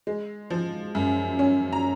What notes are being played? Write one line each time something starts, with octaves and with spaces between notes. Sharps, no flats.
G#3
F3
F#2
C#4
A#5